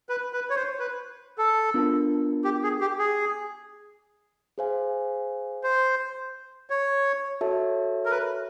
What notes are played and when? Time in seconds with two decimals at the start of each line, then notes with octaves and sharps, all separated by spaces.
0.09 B4
0.33 B4
0.50 C#5
0.56 C5
0.80 B4
1.38 A4
1.74 B3 D4 F4 A#4
2.44 G4
2.63 G#4
2.81 G4
2.99 G#4
4.58 G#4 C5 F5 G#5
5.63 C5
6.70 C#5
7.41 F#4 A4 C#5 E5 A5
8.05 A#4
8.11 B4